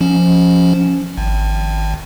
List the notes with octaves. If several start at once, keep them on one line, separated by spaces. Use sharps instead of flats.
F3 C#4
G#1